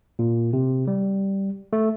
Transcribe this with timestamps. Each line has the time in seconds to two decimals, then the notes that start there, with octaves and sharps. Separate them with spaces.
0.19 A#2
0.53 C3
0.87 G3
1.73 A3